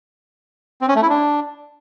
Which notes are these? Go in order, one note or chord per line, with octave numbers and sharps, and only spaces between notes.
C4
C#4
A3
E4
D4